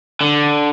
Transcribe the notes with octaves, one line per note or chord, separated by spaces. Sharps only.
D3